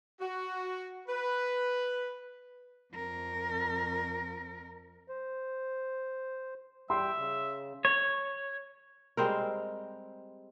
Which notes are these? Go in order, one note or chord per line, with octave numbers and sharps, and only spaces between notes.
F#4
B4
F2 A#4
C5
G3 E5 G5 C6
C#3
C#5
G3 G#3 C4 A#4